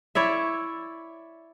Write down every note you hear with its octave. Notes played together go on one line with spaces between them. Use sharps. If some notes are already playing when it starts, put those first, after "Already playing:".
E4 C#5 D5 E5